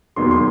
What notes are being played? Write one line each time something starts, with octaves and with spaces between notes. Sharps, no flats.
E1 D#2 D#3 F#3 B3 C6
C6